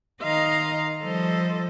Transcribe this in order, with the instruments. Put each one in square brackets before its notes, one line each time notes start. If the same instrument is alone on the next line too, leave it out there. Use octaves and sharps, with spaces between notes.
[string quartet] D#3 D#5 F5 A#5 C6
F3 G3 A4 C5 D#5